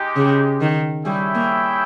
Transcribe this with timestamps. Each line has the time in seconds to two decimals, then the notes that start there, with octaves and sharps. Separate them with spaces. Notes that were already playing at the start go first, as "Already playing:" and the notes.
Already playing: G#3 D#4 G4
0.16 C#3
0.61 D#3
1.04 G3 E4 G#4 C#5 E5 G5
1.35 A#3